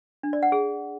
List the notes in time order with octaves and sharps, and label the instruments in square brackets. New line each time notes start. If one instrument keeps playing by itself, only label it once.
[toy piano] D4
D5
F#5
G#4